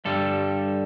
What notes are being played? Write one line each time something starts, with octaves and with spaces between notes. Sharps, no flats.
G2 D3 G3 A4